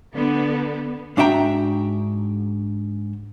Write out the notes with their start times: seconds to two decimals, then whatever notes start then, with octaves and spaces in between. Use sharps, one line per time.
0.14 D3 B3
1.17 G#2 D4 F#4 E5 G5 A#5